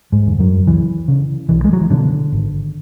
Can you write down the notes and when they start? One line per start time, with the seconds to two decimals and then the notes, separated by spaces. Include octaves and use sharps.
0.12 G#2 G#3
0.25 E2 D3
0.39 F#2 F#3
0.66 C#2 E3
1.08 C#3
1.49 B1 E3
1.64 G#3
1.73 F#3
1.81 E3
1.90 B2 D3
2.32 G#1